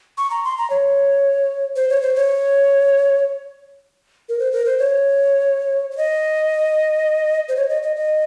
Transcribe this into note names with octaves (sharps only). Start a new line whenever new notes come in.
C#6
A#5
C6
A#5
C#5
C5
C#5
C5
C#5
A#4
C5
A#4
C5
C#5
C#5
D#5
C5
C#5
D#5
D#5
D#5